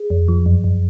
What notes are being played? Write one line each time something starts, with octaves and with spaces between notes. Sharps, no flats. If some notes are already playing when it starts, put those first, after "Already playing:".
Already playing: G#4
F2
F3
F#2
F#2